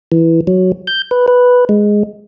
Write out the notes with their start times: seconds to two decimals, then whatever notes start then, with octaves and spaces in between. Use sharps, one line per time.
0.12 E3
0.47 F#3
0.87 G6
1.11 B4
1.28 B4
1.69 G#3